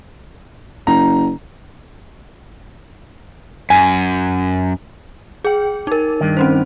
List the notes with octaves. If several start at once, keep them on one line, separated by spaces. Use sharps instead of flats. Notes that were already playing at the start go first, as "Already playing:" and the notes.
F#1 A#5
F#2 G#5
G#4 G5
D#4 A#4
G2 D#3
C4 C#4 C5